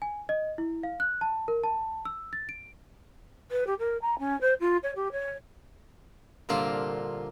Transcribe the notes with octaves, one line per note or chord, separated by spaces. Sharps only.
G#5
D#5
E4
F5
F#6
A5
A#4
A5
E6
A6
D7
B4
G4
A#4
A#5
C#4
C5
F4
C#5
G4
C#5
C2 A#2 D3 A#3 F4